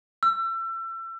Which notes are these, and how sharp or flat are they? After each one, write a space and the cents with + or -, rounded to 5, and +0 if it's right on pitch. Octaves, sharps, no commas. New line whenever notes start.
E6 +30